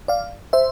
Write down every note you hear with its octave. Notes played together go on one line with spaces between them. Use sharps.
D5 F5
C5 E5